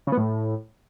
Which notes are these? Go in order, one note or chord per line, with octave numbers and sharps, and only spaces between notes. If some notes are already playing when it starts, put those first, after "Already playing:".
C#3
B3
A2